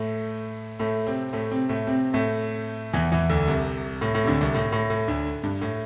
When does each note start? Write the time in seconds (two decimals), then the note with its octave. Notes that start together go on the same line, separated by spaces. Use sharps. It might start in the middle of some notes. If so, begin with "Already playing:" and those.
Already playing: A2 A3
0.80 A2 A3
1.07 C3 C4
1.33 A2 A3
1.51 C3 C4
1.69 A2 A3
1.87 C3 C4
2.14 A2 A3
2.93 E2 E3
3.12 E2 E3
3.29 D2 D3
3.48 C2 C3
4.01 A2
4.15 A2
4.23 C3
4.27 D2 D3
4.41 C2 C3
4.55 A2
4.72 A2
4.90 A2
5.08 D2 D3
5.43 G2
5.62 A2